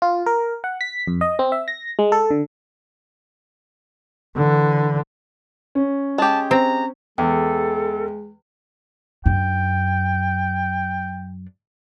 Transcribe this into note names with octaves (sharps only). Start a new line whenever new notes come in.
F4
A#4
F#5
B6
F2
D#5
C4
E5
A#6
G#3
A4
D3
D3 E3
C#4
G#3 G4 A5
C4 A#5
E2 G#3 A4 G5
F#2 D4 G5